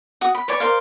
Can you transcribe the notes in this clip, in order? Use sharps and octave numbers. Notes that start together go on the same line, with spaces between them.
F#4 D#6
B5
B4 C#5 D5 G#5
A#4 C5 F5